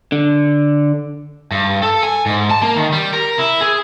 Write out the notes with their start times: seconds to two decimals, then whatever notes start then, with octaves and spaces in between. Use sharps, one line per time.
0.12 D3
1.51 G2
1.83 A4
2.03 G#5
2.26 G#2
2.50 A5
2.62 A#3
2.76 D#3
2.92 G3
3.13 A#4
3.38 E4
3.61 G#4